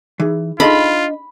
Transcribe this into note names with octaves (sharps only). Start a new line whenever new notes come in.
E3 D#4 G#4
D4 D#4 F4 G#4 A4 D#5 B5 C6